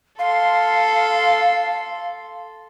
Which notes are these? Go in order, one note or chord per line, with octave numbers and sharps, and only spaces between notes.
A4 F5 C6